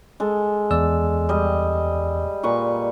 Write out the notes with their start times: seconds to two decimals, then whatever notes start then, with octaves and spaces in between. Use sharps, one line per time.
0.20 G#3 A4
0.71 E2 D5 E6
1.29 G3 D#5
2.43 A#2 B4 C#6